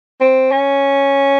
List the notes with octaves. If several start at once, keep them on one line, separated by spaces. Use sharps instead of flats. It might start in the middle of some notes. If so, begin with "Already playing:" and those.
C4
C#4